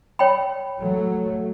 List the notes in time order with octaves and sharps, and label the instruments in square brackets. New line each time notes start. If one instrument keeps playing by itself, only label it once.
[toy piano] C#5 G5 B5
[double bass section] F#3 A3